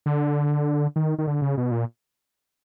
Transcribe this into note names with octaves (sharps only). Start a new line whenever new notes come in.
D3
D#3
D#3
D3
C#3
B2
A#2